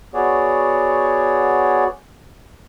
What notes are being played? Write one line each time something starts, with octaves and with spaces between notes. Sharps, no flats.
B3 F#4 G#4 C#5 D5